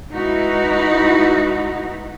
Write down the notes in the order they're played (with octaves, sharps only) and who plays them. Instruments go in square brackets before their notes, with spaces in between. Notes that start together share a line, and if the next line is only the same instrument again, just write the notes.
[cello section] G#3 D#4 E4 F#4 B4